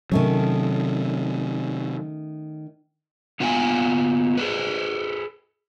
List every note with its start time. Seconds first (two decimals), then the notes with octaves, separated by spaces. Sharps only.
0.12 C3 D#3 F#3 A3 C#4
3.40 A#3 B3 F4 F5 G5 G#5
4.37 G#4 A4 B4